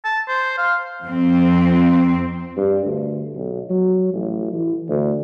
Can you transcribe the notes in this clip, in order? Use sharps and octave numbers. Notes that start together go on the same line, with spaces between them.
A5
C5
F5
F2 C4
G2
D2
B1
F#3
A1
E3
D2